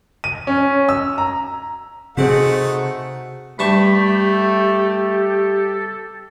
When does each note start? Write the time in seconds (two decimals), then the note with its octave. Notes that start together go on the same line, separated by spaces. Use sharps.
0.24 D#7
0.47 C#4
0.89 E6
1.18 A#5
2.17 C3 A3 C4 D#4 F#4 G#4 C5 F#5
3.59 G2 A3 G4 A5 B5 C#6
4.33 A4